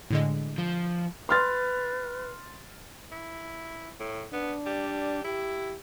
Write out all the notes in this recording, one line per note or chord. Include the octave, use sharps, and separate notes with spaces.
A2 D3 G#3
F3
B4 C6 F6 A6
E4
A2
B3 D4
G3
E4 G4